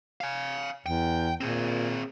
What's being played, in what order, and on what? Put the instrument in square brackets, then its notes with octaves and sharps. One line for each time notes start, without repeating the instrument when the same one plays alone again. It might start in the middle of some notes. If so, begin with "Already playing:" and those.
[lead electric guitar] F5 G#5
[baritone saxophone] E2 [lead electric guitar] G5
[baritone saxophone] A#2 [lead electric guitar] C4 G#4